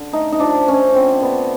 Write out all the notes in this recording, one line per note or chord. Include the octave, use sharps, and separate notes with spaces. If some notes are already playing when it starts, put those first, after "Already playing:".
Already playing: D3
A3 D#4
D#4
F3 D4
F3 C#4
D3 C4
D3 B3